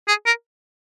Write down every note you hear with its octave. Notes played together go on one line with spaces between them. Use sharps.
G#4
A#4